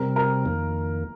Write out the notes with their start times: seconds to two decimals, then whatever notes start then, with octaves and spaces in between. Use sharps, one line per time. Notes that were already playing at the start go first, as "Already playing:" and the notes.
Already playing: C3 G3 C4 A#4
0.16 A#4
0.45 F2 D#3 A#3